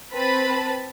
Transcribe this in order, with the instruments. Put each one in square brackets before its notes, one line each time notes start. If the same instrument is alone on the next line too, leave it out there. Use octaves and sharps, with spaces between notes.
[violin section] C4 B4 A5 B5